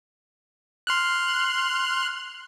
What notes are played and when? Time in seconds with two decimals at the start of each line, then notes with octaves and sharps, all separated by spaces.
0.87 C6 F6 F#6